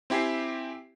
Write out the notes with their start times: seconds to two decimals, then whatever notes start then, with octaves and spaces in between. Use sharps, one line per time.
0.10 C4 E4 G4 G#5 C7